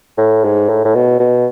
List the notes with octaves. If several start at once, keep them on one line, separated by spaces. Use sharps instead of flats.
A2
G#2
A2
A2
B2
B2